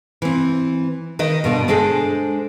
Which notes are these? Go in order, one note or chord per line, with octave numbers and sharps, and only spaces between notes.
E3 C4
D#3 B4 D#5
G2 B2 D3
G#3 D4 G#4 A4 C5